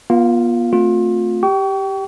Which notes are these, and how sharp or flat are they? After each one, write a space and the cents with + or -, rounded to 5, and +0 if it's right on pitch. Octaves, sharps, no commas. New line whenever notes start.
B3 -40 F4 +5 F5 +0
A3 +20 C4 +0 F4 +30
G4 +0 G5 -25 C#6 +35